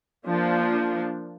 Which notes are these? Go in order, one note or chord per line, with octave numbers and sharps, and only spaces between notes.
F3 A#3 D4